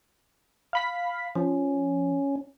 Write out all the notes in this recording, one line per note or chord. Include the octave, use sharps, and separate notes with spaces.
F5 B5 B6
F3 C#4